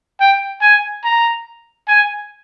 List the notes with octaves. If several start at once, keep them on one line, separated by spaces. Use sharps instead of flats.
G5
G#5
A#5
G#5